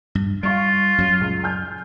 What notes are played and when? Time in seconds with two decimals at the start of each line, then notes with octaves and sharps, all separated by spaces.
0.15 G2
0.43 G3 F4 F5 C#6 D7
0.98 F#2 F#3
1.21 C#2
1.44 G#5 F6 G6